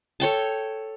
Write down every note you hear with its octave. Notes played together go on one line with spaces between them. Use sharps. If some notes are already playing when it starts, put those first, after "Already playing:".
A4 C#5 G5 A5